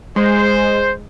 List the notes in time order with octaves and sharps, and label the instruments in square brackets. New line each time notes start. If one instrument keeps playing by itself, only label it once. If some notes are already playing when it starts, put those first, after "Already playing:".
[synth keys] G#3 [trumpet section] C5